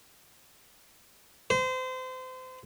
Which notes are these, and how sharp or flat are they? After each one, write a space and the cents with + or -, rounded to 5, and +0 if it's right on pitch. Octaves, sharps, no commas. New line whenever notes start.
C5 -30